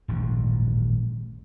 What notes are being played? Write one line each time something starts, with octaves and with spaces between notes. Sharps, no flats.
D#1 A1 G#2 F3